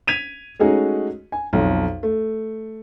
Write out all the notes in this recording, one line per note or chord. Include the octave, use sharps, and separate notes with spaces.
G#6 B6 D#7 F7
G#3 A3 C#4 D#4 F#4 G#4
G#5
B1 F2
A3